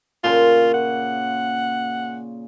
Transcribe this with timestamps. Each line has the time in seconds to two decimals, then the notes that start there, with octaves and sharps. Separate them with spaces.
0.24 A#2 C#3 F4 C6
0.74 F#5